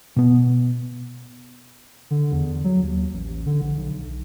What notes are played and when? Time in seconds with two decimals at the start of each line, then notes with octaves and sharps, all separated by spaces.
0.16 B2 B3
2.11 D3
2.32 E2
2.64 F#3
2.83 D#2
3.13 A1
3.46 D3
3.61 A#1
3.76 B1